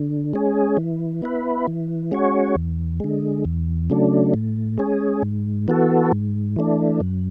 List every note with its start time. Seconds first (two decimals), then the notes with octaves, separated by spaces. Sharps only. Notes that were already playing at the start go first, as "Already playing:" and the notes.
Already playing: D3
0.33 G#3 C#4 G#4
0.77 E3
1.22 B3 E4 B4
1.67 E3
2.11 G#3 C#4 F#4 C#5
2.56 E2
3.00 D3 G#3
3.45 E2
3.90 C#3 F#3 A3 D4
4.34 A2
4.78 G#3 C#4 G#4
5.22 G#2
5.68 E3 B3 F#4 A4
6.12 G#2
6.56 E3 A3 D4
7.00 F#2